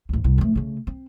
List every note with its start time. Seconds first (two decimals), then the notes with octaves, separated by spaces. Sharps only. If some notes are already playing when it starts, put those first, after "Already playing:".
0.09 A1 D2
0.24 C2
0.38 F2 A3
0.55 C#3 A3
0.87 C4